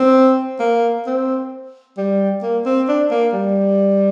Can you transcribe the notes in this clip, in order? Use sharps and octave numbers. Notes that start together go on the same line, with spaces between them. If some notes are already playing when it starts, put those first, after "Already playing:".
Already playing: C4
A#3
C4
G3
A#3
C4
D4
A#3
G3